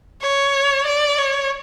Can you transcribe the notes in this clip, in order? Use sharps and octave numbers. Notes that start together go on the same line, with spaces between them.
C#5
D5
C#5